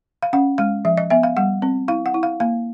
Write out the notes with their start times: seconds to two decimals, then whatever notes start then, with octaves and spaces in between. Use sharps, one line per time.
0.23 F5
0.33 C#4 F#5
0.58 G#3 F5
0.85 F3 E5
0.98 D#5
1.10 B3 E5
1.23 F5
1.37 G3 F#5
1.62 C4
1.88 E4 F5
2.06 F#5
2.14 E4
2.23 F5
2.40 A#3 F5